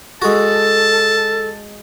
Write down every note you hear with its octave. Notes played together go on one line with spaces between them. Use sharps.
G#3 F#4 A4 A5